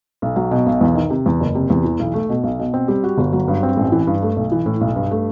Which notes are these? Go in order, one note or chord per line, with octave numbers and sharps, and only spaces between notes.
B1
F#3
B2
B1
E2
D#3
C3
E2
F#1
C3
E2
E3
B1
A3
B2
B1
B2
C4
G3
F#4
G1
F#3
G2
C4
A1
E3
G2
A3
B1
E3
A2
B1
G2
A3